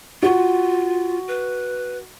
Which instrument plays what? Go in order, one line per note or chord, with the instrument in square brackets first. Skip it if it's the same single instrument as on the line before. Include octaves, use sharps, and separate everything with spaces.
[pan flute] F4 [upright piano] F#4 C#6
[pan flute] B4